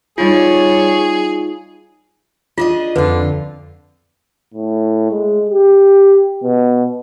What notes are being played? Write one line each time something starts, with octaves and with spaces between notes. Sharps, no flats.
G3 D#4 F4 G#4 C#5
D4 F4 G#4 D#5
F2 D3 F4 B4
A2
G#3
G4
B2